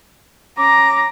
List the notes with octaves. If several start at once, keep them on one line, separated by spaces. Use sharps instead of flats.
C#4 A#5 D6